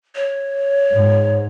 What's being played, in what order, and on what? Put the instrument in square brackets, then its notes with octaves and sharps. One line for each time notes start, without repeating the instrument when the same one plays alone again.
[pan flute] C#5
[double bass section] G#2